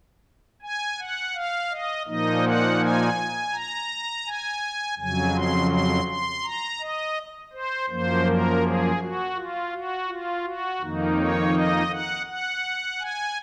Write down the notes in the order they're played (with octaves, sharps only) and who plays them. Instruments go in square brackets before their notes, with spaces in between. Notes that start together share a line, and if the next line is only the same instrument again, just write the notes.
[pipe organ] G#5
F#5
F5
D#5
A#2 F3 A#3 D#4 D#5
F#5
G#5
A#5
G#5
F2 C#3 F#3 G#5
C6
C6
C6
A#5
D#5
C5
F#2 F3 A#3 C5
A#4
G#4
F#4
F4
F#4
F4
F#4
F2 D#3 A#3 D#4
C#5
D#5
F#5
F#5
G#5